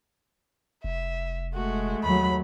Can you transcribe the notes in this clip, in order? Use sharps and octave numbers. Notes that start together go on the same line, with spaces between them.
F1 E5
G#3 A3 F#4
D#2 F#3 B5